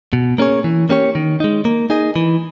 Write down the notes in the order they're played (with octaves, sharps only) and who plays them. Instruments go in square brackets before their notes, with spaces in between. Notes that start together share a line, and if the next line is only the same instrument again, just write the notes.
[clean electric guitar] B2
A#3 C#4 G#4 C#5
E3
A#3 C#4 G4 C#5
D#3
G#3 D#4
A#3
D#4 G#4 D#5
E3